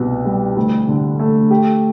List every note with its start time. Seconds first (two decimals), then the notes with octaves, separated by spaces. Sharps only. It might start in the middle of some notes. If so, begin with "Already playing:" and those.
Already playing: C2 B2
0.25 G3
0.56 D2
0.88 D3
1.19 A3
1.50 G4